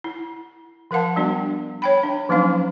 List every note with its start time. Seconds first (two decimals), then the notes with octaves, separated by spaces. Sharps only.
0.04 E4
0.91 F3 A#4 F5 F#5 A5
1.16 G3 B3 D4 F#4
1.82 C#5 G5 B5
2.03 D4
2.29 F3 F#3 A#3 C#4 D#4 F5